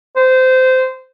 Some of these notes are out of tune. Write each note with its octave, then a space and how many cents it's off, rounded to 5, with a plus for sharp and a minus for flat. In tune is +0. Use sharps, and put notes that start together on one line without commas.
C5 -20